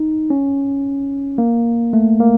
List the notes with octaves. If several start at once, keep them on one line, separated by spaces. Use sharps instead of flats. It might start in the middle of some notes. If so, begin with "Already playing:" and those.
Already playing: D#4
C#4
A#3
A3
A#3